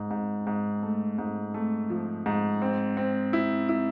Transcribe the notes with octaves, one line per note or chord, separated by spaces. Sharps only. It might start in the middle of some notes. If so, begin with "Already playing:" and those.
Already playing: G#2
G#2
G#2
A3
G#2
A3
F3
G#2
C4
C4
E4
E4